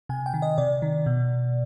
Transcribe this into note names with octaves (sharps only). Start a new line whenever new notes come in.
C3 G#5
G5
D#3
D#5
C3 D5
D#3
B2